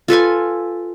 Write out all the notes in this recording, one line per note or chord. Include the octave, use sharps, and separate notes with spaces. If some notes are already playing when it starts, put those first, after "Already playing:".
F4 A4 B4 G#5